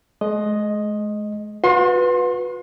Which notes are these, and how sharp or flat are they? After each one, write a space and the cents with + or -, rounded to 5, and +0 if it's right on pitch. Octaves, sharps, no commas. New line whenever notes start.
G#3 +35 D#5 +0
F#4 -40 B4 +0 C6 +25